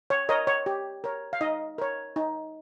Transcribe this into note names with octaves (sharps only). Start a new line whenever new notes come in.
C#5
A#4 C#5 D#5
C#5
G4
A#4 C#5
F5
D#4 D#5
A#4 C#5
D#4